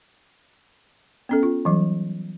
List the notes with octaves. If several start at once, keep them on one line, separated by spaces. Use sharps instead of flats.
B3 C#4 A4
F4
E3 F#3 G3